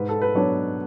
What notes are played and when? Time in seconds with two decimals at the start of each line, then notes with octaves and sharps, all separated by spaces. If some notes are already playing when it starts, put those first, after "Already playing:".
Already playing: G#2 B4
0.09 A4
0.22 B4
0.35 F#3 B3 D4 C#5